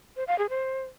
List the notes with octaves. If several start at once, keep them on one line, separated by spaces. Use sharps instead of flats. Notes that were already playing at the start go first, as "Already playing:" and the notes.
C5
F5
G#4
C5